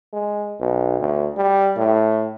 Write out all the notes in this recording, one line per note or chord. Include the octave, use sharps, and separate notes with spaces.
G#3
B1
D2
G3
A2